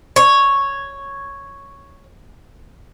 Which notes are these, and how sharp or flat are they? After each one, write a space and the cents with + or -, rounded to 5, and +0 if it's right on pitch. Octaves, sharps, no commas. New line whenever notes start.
C#5 +0